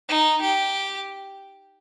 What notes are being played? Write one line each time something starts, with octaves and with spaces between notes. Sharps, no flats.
D#4
G4